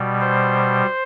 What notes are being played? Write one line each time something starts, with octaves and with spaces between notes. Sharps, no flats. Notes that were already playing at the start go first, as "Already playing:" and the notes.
Already playing: B2 G3
C5